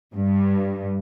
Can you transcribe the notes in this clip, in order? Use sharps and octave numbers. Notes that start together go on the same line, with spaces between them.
G2